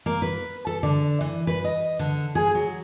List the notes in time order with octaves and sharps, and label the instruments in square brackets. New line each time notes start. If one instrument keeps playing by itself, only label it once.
[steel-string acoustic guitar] A#3
B4
A4
D3
E3
B4
D#5
D3
G#4
F#3